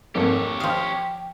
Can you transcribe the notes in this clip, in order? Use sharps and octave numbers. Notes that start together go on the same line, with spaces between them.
G#1 F2 A#3 G4 C#5
F3 F5 G5 D#6